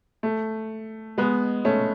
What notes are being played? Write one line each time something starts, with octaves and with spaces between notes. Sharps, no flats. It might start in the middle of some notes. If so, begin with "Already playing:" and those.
A3
G#3 B3
A3 C#4